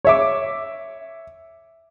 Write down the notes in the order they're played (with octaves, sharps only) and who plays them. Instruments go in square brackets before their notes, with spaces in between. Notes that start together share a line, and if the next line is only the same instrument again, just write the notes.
[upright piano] C#5 E5 D6